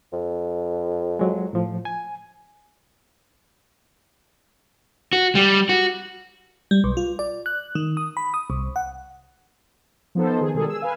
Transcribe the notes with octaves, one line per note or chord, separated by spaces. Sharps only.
F2
F#3 G#3
A2 F3
G#5
F#4
G3
F#4
G3
B1
F4
D5
F#6
D#3
D#6
B5
D#6
C2
F#5
F3 B3 D#4 A4 C5
D#3 G#4
B2 D#3 G3 G#3 G#4 A4
G#4 E6
B4 F5 G#5